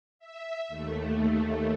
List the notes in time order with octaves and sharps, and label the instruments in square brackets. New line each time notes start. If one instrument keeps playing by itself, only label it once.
[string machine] E5
D#2 A3